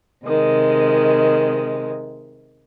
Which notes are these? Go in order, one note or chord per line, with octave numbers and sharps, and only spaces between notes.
C3 D#3 G#3